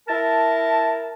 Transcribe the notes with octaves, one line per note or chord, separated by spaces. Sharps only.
E4 A#4 A5